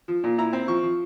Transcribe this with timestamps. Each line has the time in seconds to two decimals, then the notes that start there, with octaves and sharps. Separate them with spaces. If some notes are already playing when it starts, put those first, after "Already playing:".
0.08 F3
0.24 A#2
0.38 E4 A#5
0.53 C4
0.68 F3 C#6
0.83 F3